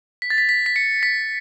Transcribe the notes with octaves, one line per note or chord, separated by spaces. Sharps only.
B6
A6
B6
B6
B6
C#7
B6